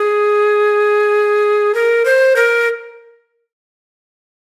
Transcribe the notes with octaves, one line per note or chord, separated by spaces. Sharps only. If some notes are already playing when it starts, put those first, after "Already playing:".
Already playing: G#4
A#4
C5
A#4